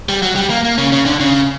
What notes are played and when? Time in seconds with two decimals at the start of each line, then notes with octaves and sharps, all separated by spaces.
0.09 G3
0.22 F#3
0.36 G3
0.50 A#3
0.65 A#3
0.78 C#3
0.92 C#3
1.06 D3
1.20 C#3